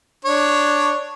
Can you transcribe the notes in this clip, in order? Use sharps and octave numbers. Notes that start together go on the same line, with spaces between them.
D4 C#5